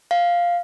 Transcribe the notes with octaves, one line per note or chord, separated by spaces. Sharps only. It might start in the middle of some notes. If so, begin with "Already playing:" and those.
F5